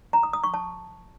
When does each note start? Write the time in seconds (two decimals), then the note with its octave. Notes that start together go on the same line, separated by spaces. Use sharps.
0.13 A#5
0.23 D#6
0.33 D#6
0.44 C#6
0.54 A5